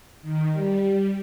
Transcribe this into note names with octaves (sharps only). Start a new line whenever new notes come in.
D#3
G3